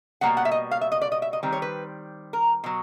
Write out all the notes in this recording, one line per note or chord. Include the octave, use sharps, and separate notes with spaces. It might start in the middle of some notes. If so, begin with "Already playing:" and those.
B2 G3 A#3 F#5
F#5
E5
D#5
F5
E5
D#5
D5
D#5
E5
D#5
D#3 G3 C4
C#5
B4
A#4
B2 F#3